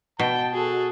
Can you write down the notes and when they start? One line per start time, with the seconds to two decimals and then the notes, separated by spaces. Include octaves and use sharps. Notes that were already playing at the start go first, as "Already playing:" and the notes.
0.19 B2 G5 A5
0.53 F#4 G#4 A4